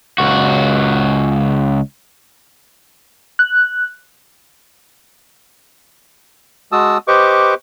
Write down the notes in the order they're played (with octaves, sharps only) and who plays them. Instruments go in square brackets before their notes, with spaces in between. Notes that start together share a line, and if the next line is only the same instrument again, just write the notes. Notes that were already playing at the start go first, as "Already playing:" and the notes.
[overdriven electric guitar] C#2 F#4
[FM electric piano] F#6
[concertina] G#3 F#4 A5 D#6 E6
G4 B4 C5 D#5 C#6 D6